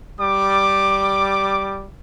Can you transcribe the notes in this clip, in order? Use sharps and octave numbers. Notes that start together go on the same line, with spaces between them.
G3 D6